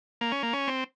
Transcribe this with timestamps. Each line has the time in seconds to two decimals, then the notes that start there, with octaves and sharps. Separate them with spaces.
0.21 A#3
0.32 C#4
0.43 A#3
0.53 C#4
0.68 C4